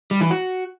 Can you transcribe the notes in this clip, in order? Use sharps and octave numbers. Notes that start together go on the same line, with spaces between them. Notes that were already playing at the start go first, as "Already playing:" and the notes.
G3
E3
F#4